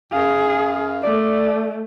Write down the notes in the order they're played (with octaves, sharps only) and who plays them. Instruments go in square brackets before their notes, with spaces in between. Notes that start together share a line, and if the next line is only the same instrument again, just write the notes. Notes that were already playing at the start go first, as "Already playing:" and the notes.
[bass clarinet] F#2 [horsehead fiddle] G#4 [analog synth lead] F5
[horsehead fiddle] A3 [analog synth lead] D5